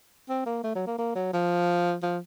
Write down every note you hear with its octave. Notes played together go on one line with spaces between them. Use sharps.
C4
A#3
A3
F#3
A#3
A#3
F#3
F3
F3